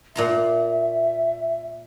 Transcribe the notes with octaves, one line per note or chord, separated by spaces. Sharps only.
A#2 E5 A#5 C6